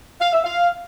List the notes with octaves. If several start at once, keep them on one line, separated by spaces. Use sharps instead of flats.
F5
E5
F5